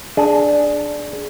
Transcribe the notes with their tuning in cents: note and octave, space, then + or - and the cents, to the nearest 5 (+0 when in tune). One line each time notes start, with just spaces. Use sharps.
D4 +0 G#4 +10